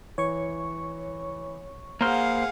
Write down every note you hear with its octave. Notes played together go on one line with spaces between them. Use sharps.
E3 C#5 C#6
A#3 G#4 C5 F5 F#5 A#5 F6